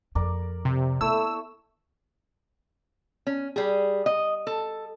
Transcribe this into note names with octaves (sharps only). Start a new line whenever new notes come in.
F2 A#4 D5
C3
A3 B3 E4 C#5 E6
C#4
G3 G#4
D#5
A4